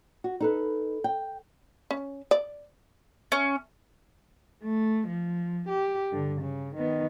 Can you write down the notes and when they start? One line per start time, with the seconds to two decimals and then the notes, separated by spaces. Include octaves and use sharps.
0.24 F#4
0.40 D#4 A4 B4
1.04 G5
1.91 C#4
2.31 D5
3.32 C#4
4.63 A3
5.07 F3
5.69 G4
6.12 G2 D3
6.41 C#3
6.76 D#3 B3